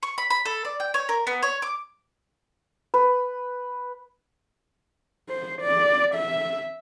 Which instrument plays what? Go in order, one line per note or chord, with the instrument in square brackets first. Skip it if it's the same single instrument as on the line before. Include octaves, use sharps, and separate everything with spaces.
[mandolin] C#6
B5
B5
A4
D5
G5
C#5
A#4
B3
C#5
D6
[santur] B4
[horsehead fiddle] C5
D5
E5